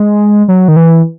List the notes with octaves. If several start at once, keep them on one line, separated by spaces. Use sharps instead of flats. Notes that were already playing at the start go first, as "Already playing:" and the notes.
Already playing: G#3
F#3
D#3
E3